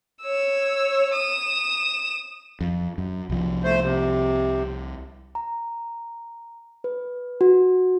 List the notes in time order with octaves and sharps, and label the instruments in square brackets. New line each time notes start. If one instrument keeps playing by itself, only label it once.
[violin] C#5 E6
D#6 E7
[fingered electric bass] F2
F#2
C2 F3
[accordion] A3 C5
C3
[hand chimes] A#5
B4
F#4